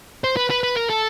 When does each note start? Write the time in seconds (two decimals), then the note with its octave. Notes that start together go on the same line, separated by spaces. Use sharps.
0.24 C5
0.37 B4
0.50 B4
0.63 B4
0.77 A#4
0.90 A4